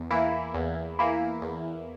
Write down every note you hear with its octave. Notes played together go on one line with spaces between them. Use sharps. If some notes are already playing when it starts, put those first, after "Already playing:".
Already playing: E2
E3 A#3 E4
E2
E3 A#3 E4
E2